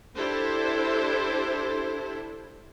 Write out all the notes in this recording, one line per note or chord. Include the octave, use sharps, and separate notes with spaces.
D4 E4 G4 A4 C5